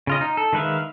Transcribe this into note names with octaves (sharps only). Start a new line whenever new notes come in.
C#3 F4 D#5
D#4
A4
D#3 G#3 B4 E5 F5